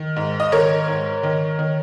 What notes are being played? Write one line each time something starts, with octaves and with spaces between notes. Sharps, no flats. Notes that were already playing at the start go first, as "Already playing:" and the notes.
Already playing: D#3
G#2
D#5
D#3 A#4 C#5
G#2
D#3
D#3